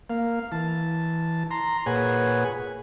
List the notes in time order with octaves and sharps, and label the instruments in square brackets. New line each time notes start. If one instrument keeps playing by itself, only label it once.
[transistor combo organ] A#3 F5
E3 A5
A#5 C6
A#2 G#4 B4 C#5 F#5 G#5